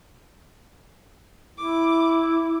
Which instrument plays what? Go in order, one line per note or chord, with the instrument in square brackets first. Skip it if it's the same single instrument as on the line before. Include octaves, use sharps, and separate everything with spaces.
[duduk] E4 [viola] D6